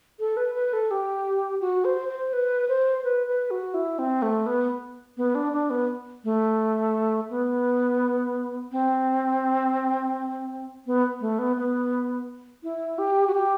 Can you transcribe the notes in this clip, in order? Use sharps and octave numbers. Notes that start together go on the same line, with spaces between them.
A4
B4
B4
A4
G4
F#4
C5
C5
B4
C5
B4
B4
F#4
E4
C4
A3
B3
B3
D4
D4
B3
A3
B3
C4
B3
A3
B3
B3
E4
G4
F#4
G4